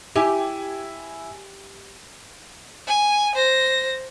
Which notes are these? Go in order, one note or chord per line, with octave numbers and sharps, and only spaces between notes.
E4 G4 G#5
G#5
C5 A#6